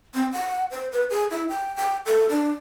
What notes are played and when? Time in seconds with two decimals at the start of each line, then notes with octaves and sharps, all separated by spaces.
0.14 C4
0.32 F#5
0.71 C5
0.92 B4
1.10 G#4
1.31 E4
1.49 G5
1.76 G5
2.06 A4
2.29 D4